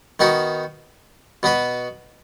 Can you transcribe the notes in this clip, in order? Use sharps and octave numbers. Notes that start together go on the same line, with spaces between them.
D#3 B3 D#4 F#4
B2 B3 F#4 B4